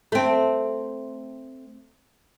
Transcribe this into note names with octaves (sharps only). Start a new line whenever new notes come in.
A3 C4